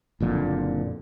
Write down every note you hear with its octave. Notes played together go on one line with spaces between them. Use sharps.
F#1 F2 A#2 D3